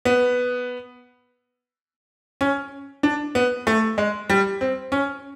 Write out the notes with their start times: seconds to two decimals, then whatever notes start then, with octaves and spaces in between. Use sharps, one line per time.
0.05 B3
2.41 C#4
3.03 D4
3.35 B3
3.67 A3
3.98 G#3
4.30 G3
4.61 C4
4.92 C#4